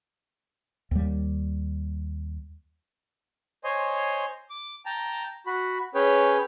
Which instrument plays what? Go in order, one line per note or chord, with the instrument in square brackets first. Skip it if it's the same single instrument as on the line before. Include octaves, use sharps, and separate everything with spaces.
[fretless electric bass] D#2 G3
[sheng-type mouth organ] C5 C#5 D#5 G#5 C6
D6
G5 A5 A#5
F#4 B5
C#4 G#4 B4 C#5 G5